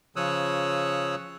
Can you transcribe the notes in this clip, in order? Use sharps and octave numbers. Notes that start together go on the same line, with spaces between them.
C#3 F3 C#5 D#6 E6 F#6